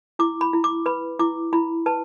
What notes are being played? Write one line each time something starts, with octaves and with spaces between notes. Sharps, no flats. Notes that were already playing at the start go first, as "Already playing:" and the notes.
E4 D6
B5
E4
D6
B4 B5
E4 D6
E4 B5
B4 A5